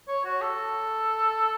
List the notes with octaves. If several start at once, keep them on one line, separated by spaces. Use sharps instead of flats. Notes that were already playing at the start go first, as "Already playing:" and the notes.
C#5
F#4
A4